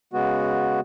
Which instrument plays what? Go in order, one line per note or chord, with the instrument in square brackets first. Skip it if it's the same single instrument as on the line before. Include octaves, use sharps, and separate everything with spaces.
[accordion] C#3 G#3 B3 F#4